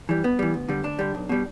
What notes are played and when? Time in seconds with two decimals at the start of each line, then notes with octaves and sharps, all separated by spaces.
0.09 E3 G3
0.23 G2 B3
0.39 E3 G3
0.54 D2
0.68 D3 G3
0.83 D2 D4
0.99 D3 G3
1.15 B1
1.29 B2 G3